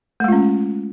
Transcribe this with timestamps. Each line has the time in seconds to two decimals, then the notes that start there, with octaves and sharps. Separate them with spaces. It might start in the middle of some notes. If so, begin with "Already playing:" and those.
0.20 A3
0.24 G#3
0.28 F4
0.32 C#4